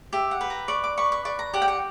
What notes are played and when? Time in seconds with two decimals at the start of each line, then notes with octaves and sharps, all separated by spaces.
0.13 G4 E5
0.31 F#5
0.41 B4
0.50 A#5
0.68 D5 C#6
0.84 D6
0.97 B4 C#6
1.12 C#6
1.25 D5 C#6
1.39 A#5
1.53 G4 F#5
1.62 G5
1.68 F#5